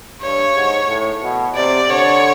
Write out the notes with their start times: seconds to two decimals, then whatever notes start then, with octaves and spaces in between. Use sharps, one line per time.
0.21 G2 C#5
0.55 G#2
0.88 A2
1.22 B2
1.55 C3 D5
1.89 D3 C#5